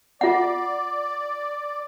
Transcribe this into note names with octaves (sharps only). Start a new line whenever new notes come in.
F4 D5 F#5